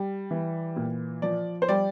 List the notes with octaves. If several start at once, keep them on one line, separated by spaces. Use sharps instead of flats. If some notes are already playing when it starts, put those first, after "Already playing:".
Already playing: G3
E3
A#2
F3 D5
C5
G3 D5